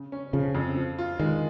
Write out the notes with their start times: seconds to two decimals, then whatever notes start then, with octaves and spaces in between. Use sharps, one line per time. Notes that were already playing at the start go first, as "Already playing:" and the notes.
Already playing: C#3
0.12 C#4
0.33 C#3 F3
0.55 F2
0.76 F3
0.99 F4
1.19 D#3 G#3